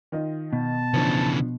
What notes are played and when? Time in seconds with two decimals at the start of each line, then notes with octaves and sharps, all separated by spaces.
0.12 D#3 F4 D#5
0.53 B2 A5
0.94 C#3 E3 F3 D4